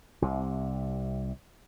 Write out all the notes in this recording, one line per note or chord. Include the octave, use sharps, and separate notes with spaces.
C2 C3